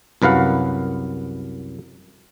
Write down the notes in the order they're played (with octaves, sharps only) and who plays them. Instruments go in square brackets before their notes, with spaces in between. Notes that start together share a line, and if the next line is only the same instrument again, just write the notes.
[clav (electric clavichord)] C2 F#2 B4 F5 F#5